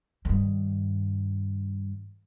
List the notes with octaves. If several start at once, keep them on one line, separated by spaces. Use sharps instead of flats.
G2 D#3